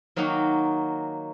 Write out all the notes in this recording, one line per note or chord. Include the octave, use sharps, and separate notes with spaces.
D#3 F#3 A#3 D#4 F#4